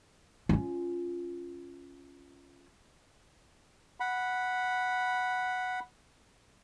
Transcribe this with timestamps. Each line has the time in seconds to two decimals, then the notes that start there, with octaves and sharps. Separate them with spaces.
0.49 C#4 F4
4.00 F#5 B5